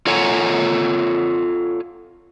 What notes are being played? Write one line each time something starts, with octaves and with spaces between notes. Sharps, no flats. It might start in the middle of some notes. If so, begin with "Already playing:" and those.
F4 A4 C#5 F#5 G#5 A#5